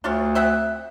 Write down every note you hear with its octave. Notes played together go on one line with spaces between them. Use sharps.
D2 D4 F4 C#5
C4 E5 F#5